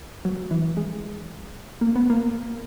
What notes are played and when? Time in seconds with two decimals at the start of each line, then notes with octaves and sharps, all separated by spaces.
0.25 F#3
0.51 E3
0.77 G#3
1.81 A#3
1.96 B3
2.10 A#3